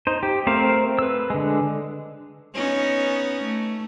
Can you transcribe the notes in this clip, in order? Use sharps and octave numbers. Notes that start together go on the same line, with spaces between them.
D#4 C5
G4
A3 C4 A#4 C5 F5
B4 E6
D3 G#3
B3 C#4 D#4
A3